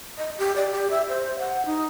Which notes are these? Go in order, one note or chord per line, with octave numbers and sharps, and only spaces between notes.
D#5
G4
D5
G4
E5
C5
F#5
D#4